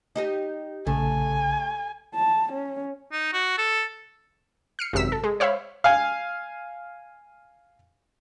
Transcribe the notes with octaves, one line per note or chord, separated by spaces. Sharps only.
D#4 G4 D#5
A#1 C#3 A3 G#5
A5
C#4
D#4
F#4
A4
F6 C7 C#7
G#1 F#2 C3 E6 B6
A4
G#3
C5 C#5 E5 F5 B5
F5 G#5